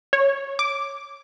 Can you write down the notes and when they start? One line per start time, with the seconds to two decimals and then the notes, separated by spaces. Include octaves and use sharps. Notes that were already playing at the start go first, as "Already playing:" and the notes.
0.13 C#5
0.59 D6